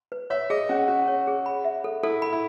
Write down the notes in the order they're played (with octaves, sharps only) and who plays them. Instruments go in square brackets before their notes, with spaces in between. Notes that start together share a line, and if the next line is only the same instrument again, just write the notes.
[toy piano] B4
[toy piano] C#5 [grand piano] E5
[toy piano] G#4 [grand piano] D#5
[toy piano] C#4 [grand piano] F#4
[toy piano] C#4 [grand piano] F#4
[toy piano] C#5
G#4
B5
E5
A4
[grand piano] E4 [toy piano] A4
[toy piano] B5
[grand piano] E4